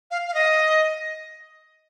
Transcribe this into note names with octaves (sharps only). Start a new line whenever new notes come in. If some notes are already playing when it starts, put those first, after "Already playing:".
F5
F5
D#5